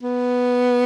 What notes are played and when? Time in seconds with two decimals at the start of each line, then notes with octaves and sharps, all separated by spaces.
0.03 B3